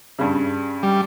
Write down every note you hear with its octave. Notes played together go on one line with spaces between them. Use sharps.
G2 C#3
G3